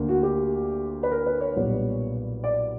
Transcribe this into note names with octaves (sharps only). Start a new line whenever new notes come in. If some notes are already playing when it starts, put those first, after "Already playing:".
Already playing: D2 D3 A#3
F#4
G4
B4
A#4
B4
C#5
B1 A#2 G3 B3
D5